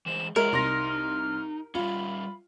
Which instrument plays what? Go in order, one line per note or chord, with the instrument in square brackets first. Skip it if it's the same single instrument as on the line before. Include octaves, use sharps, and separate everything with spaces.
[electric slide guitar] E3 G#3 C5 [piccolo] E7
[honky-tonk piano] G#3 [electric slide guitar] F4 F#4 C#5 [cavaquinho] A#4 [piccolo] E5
[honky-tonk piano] C2 C6 A#6 [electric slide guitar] D#4 [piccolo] F6
[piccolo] F6
[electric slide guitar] G3 C#4 [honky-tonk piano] F4 [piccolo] B5